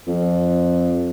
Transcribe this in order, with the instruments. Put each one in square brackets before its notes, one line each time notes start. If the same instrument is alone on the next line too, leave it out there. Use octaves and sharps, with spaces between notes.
[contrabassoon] F2